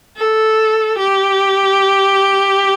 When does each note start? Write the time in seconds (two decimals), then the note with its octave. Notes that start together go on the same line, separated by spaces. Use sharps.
0.16 A4
0.98 G4